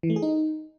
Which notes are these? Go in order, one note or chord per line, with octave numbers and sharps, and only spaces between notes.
E3
A3
G#4
D#4